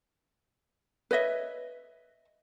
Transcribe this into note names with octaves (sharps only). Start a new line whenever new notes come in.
B4 C#5 D#5 E5